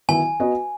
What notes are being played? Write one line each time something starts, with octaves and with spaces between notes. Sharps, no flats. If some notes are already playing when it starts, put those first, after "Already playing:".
D#3 F#3 B3 E4 G#5
B3 F#4 B4 D#5